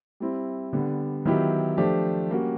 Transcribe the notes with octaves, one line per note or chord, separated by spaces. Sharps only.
G3 C4 E4
D3 G3 B3
D#3 F#3 B3 E4 G4
F3 A3 D4 G4
G3 A#3 C#4 F#4